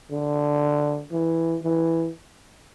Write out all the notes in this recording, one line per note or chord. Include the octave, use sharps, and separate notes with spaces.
D3
E3
E3